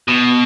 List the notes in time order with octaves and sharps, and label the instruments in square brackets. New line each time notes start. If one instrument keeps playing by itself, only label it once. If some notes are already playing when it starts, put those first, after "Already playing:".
[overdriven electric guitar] B2